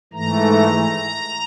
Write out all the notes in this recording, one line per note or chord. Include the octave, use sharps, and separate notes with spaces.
G#2 E3 A3 A#5